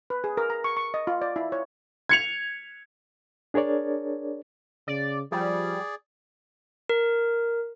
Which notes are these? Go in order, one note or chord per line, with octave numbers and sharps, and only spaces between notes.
B4
G#4
A#4
A#5
C#6
C#6
D#5
F4
D5
E4
C#5
G#6 C#7 F7
D4 G#4 A#4 C#5 D5
C#3 D5
F3 G3 G#4 D5
A#4